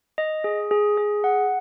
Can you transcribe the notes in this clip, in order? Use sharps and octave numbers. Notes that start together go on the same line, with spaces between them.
D#5
G#4
G#4
G#4
F#5